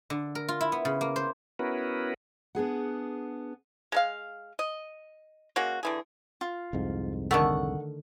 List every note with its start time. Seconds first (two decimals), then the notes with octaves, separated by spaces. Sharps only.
0.10 D3
0.35 A#4
0.48 F4
0.61 E4
0.72 B3
0.85 C#3
1.01 A#3
1.16 C5
1.59 B3 C#4 E4 F#4 A#4 B4
2.55 B3 D4 G#4 F#5
3.92 G#3 A#4 F5
4.59 D#5
5.56 G#3 A#3 C#4 F#4
5.83 D3 E3 G#4
6.41 F4
6.73 C2 F2 G#2
7.31 D3 D#3 A3 F#5 C#6